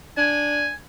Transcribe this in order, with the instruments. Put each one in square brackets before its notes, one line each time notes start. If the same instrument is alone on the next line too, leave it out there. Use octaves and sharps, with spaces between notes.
[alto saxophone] D4 [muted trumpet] G#5